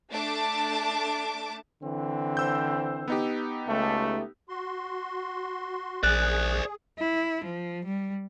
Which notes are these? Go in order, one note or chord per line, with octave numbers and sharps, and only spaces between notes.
A3 D4 A5 D6
D3 E3 C4
C5 E6 G6
B3 D#4 G4
C#2 A3
F#4 C6
A#1 G#4 C5 D5 F#6
E4
F3
G3